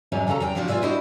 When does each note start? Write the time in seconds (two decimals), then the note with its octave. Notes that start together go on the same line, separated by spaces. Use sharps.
0.12 E2 G#2 C3 F#3 G#3 C#4
0.27 D#2 C#3 F#3 A4 A#5
0.40 E2 F#3 G5 A#5
0.55 C3 F3 C4 D4 F#4
0.68 B3 F4 G#4 D5 E5
0.82 D4 E4 F#4 C5 D#5